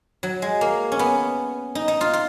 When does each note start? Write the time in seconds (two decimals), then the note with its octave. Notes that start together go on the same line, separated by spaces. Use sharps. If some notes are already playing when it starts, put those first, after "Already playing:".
0.23 F#3
0.42 G#3
0.61 A#3
0.92 C#4
0.99 B3
1.75 D#4
1.88 D#4
2.01 F4
2.13 F4